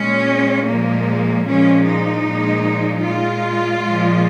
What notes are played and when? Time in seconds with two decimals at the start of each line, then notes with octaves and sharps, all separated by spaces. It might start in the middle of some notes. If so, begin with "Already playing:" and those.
Already playing: A#2 G#3 C#4
0.66 A#2 F3 G#3 A#3
1.45 A#2 F3 G#3 C#4
1.84 D#4
2.24 A#2 F3 G#3
3.03 A#2 G#3 F4
3.82 A#2 F3 G#3